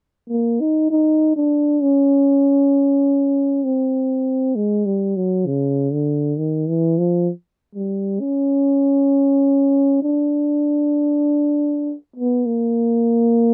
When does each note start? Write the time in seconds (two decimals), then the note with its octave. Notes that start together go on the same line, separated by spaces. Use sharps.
0.30 A#3
0.60 D#4
0.91 D#4
1.36 D4
1.82 C#4
3.64 C4
4.56 G#3
4.86 G3
5.16 F#3
5.46 C#3
5.93 D3
6.38 D#3
6.68 E3
6.98 F3
7.75 G3
8.20 C#4
10.02 D4
12.16 B3
12.46 A#3